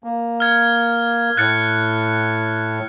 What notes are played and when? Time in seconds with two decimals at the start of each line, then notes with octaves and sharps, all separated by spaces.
0.04 A#3
0.40 F6 G#6
1.37 A2 F#6 A6 C#7